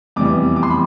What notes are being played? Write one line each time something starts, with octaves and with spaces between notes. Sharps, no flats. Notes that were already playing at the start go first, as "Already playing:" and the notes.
F1 E2 C3 E3 G3 D6
D6
C6
B5